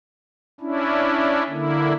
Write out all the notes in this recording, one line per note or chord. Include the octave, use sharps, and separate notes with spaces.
C#4 D4 E4
D3 A#3 E4